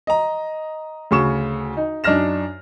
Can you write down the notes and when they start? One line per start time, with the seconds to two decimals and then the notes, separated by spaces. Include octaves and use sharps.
0.07 D#5 A#5
1.11 D2 C#3 C#6 E7
1.77 D#4
2.04 F#2 D4 D#4 F6 A#6 E7